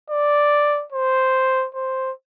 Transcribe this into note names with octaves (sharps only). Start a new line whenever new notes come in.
D5
C5
C5